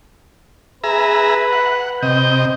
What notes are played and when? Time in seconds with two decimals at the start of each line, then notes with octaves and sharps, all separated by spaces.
0.84 G#4 B4 E5 A#5
1.52 F#5
2.03 C3 D#5 G6